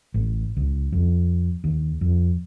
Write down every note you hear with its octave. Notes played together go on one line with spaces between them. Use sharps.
A1
C#2
F2
D#2
F2